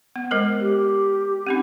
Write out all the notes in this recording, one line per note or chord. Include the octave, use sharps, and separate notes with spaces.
B3
G#3 A#4 C5
G4
C4 C#4 D#4